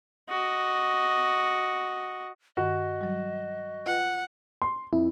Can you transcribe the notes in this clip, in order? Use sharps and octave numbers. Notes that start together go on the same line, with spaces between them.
F#4 D#5
G2 D#3 F#4 D#5
F#3 G3
F4 B4 F#5 G5
C6
F2 E4